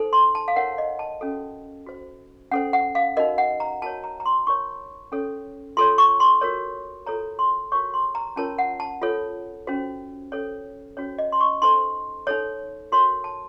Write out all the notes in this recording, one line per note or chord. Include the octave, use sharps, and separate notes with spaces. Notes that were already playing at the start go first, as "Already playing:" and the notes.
Already playing: D#4 A4 C5
C6
A5
F5
D#4 A#4 C#5 F#5
D#5
A5
C#4 F#4 A4
F#4 C5
C#4 A4 C5 F#5
F#5
F5
D#4 F#4 A#4 D#5
F#5
A#5
F#4 A#4 C#5 A5
A#5
A#5
C6
D#4 A#4 C#5 C#6
C#4 A4 C#5
F4 A4 C#5 C6
C#6
C6
F#4 A#4 C#5
F4 A4 C#5 A#5
C6
F#4 A#4 C#5 C#6
C6
A#5
C#4 F4 A#4 C#5 A5
F#5
A5
F4 A4 C#5
C#4 F#4 C5
C#4 A4 C5 C#5
C#4 F#4 C5 C#5
D#5
C6
C#6
D#4 A4 C5 C6
D#4 A4 C#5
F#4 A#4 C#5 C6
A5